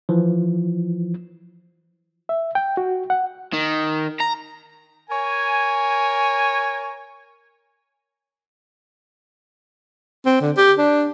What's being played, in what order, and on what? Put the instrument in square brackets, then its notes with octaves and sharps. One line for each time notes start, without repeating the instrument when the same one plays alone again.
[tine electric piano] E3 F3
[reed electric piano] E5
G5
F#4
F#5
[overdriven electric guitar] D#3
A#5
[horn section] A#4 C#5 G#5
[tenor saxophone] C4
D3
G4
D4